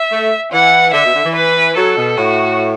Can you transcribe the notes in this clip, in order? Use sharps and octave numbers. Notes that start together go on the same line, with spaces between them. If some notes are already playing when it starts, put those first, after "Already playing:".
Already playing: E5
A3
E3 F#5
D3 E5
B2
D3
E3
B4
F#3 A4
B2
A2 F#4